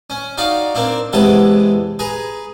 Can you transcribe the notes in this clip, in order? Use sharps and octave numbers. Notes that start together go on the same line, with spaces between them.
C#4
D#4 F#4 D5 F5
A#3 C4 D4
E2 C3 G#3 A4 B4 F#5
G#4 B4 A#5